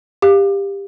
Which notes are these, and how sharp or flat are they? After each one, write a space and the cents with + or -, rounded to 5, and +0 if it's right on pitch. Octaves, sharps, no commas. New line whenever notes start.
G4 +20 F5 +0